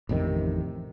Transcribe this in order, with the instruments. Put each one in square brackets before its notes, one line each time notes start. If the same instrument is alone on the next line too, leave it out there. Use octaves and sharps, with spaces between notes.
[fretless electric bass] A1 F2 C3 D#3